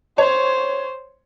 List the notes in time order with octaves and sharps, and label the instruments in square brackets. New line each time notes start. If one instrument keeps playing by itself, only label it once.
[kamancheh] C5 [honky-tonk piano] C#5